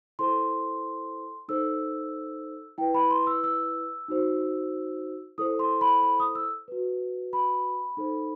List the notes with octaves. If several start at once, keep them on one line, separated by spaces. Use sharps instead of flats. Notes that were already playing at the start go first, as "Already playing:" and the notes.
E4 A4 C5 C6
D#4 A4 C5 E6
E4 B4 G5
B5
C6
E6
E6
D#4 F#4 C5
E4 A4 C5 D#6
C6
B5
B5
D#6
E6
F#4 B4
B5
D#4 A4 C5